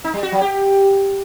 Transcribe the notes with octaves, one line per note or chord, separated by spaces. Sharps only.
D#4
G3
F#4
F#3
G4